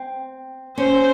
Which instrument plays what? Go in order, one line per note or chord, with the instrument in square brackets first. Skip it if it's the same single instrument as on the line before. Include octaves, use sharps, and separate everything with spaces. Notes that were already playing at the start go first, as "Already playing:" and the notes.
Already playing: [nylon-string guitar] C4
[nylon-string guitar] C#4 [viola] C5